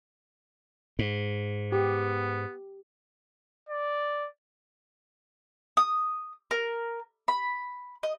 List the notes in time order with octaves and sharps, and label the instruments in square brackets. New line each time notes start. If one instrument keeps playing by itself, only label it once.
[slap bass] G#2
[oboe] B3 [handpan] G4
[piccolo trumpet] D5
[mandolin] D#6
A#4
B5
D#5